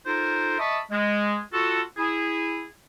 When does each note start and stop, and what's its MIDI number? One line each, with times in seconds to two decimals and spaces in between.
0.06 0.55 63
0.06 0.55 65
0.06 0.55 69
0.06 0.55 70
0.06 0.55 72
0.59 0.79 75
0.59 0.79 76
0.59 0.79 81
0.59 0.79 83
0.59 0.79 85
0.59 0.79 87
0.91 1.37 56
1.53 1.81 65
1.53 1.81 66
1.53 1.81 69
1.97 2.65 64
1.97 2.65 68